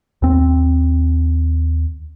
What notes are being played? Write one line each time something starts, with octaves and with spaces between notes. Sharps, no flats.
D#2 C4